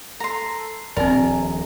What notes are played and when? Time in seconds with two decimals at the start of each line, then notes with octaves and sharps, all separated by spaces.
0.20 A4 A#5 C6
0.97 D#1 A#1 A#2 C4 A#4 D5 G#5